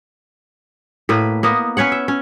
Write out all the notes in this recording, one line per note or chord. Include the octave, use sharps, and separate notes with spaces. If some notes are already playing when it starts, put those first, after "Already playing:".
A2 A#3 B4
A#3 B3 D#5
C#4 B4 C#5 F#5
E5
C#4